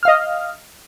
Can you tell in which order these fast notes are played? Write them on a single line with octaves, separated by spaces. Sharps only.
F6 F5 D#5